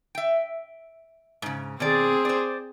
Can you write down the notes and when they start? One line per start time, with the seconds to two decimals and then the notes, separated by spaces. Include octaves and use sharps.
0.15 E5 G5
1.42 G#2 C#3
1.80 B2 D#3 C4 G#4 D5
2.25 C5 D5